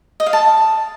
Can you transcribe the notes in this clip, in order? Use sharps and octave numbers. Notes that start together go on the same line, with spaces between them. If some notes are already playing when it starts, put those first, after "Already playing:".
D#5
F5
A5